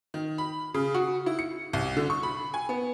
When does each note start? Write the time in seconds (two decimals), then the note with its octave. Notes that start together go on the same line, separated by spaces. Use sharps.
0.14 D#3
0.38 B5
0.74 C#3
0.94 F#4
1.26 E4
1.39 C#7
1.73 C2
1.97 D3
2.10 C#6
2.23 B5
2.54 G#5
2.69 B3